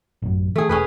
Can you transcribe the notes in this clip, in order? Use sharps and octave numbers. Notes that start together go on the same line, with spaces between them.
A1 F#2
E3 A3 G#4
E1 C#4 G#4 B4